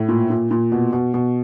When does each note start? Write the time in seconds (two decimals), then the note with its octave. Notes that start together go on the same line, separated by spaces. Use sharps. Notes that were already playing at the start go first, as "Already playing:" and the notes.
Already playing: A2
0.09 A#2
0.30 A#2
0.51 A#2
0.72 B2
0.93 B2
1.14 B2